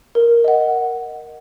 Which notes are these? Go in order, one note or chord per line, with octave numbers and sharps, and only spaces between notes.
A#4
D#5 F#5